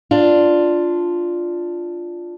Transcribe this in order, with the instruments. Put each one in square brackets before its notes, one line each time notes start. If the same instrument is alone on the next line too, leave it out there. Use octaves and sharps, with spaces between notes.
[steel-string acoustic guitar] D4 F4